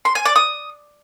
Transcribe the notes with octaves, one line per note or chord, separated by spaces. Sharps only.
C6
G#5
D5
D#6